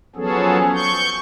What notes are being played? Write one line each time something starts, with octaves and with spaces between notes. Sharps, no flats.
F3 F#3 B3 C#4 G#4 A4
C#6 G6